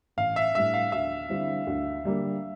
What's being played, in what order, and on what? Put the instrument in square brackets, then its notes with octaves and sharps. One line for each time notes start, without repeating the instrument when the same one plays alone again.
[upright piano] A1 [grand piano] F5
[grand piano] E5
[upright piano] A2 G3 D4 [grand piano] E5
[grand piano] F5
[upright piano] D2 [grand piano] E5
[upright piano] D3 G3 C4 E4
D2
D3 G3 A#3